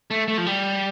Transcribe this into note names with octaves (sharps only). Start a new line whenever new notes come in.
A3
A3
F3
G3